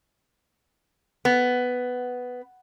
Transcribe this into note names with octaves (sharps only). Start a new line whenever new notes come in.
B3